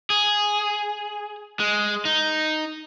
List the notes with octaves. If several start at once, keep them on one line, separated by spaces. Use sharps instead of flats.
G#4
G#3
D#4